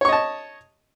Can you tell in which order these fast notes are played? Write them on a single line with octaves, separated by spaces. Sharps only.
C#5 C#6 D#5 A5